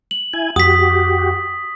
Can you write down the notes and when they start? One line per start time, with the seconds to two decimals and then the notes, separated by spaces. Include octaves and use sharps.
0.11 F#7
0.34 E4 G#5
0.56 F2 F#4 G4 D#6 B6